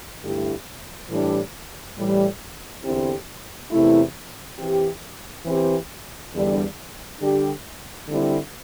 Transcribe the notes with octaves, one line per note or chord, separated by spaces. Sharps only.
G2 D3 A3 E4 G4
A2 E3 G3 D4 G4
A2 E3 G3
E2 D3 C4 E4 G4
E2 C3 A3 E4
E3 C4 G4
E3 C4 G4
E2 D3 G3 D4
D3 G3 D4 G4
D3 G3 C4 E4